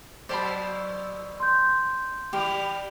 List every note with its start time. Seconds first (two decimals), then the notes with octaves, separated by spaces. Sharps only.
0.29 B2 F#3 C5 D5 A5 B5
1.40 C6 G6
2.33 E3 G3 G4